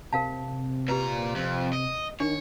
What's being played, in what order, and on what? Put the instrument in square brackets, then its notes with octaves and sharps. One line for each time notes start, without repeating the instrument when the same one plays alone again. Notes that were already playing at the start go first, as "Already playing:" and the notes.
[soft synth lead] C3 [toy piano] A#4 F5 A5
[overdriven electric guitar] A#2 A#5 [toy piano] G4 B4
[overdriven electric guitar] F2
D#5
[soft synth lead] D#3 [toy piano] D4 [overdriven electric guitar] C#5